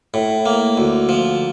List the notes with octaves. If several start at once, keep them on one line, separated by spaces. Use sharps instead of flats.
A2
A#3
D2
F3